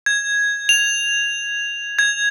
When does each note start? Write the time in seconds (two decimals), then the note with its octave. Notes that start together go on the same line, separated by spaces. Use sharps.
0.06 G#6
0.69 F7
1.99 G#6